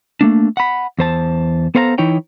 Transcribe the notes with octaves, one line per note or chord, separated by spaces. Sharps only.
A3 A#3 D4
F#5 B5
E2 C5 A5
B3 A4 C5 F5 G5 A#5
E3 D#4 E4 C#5 G5